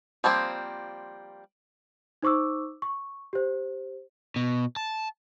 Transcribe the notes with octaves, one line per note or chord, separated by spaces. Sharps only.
F3 G3 A#3 C4
D#4 C5 C#6 D6 E6
C#6
G4 C5
B2
A5